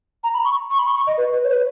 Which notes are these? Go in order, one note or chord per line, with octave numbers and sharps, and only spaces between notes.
A#5
B5
C#6
C#6
B5
C#6
C#6
D#5
B4
B4
C#5
B4